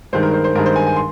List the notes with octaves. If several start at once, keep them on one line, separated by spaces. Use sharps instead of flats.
G2 D#3 G#3 C5
A#4
C5
C5
G2 D#3 G#3 A#4
C5
G#5
G#5
C6